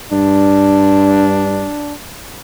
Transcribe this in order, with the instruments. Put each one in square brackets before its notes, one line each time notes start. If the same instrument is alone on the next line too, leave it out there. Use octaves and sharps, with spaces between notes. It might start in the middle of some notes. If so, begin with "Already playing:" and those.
[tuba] G2 [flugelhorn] D4